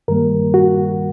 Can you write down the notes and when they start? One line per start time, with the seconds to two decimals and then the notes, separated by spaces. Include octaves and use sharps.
0.08 G2 D#3 G3 A#3 A#4
0.54 F#4